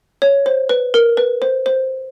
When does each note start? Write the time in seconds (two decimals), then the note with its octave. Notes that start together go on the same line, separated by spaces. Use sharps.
0.22 C#5
0.46 C5
0.69 B4
0.94 A#4
1.17 B4
1.42 C5
1.66 C5